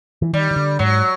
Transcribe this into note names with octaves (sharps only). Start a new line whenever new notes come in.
E3
D#3 G3
D#3
D3
G#2 F#3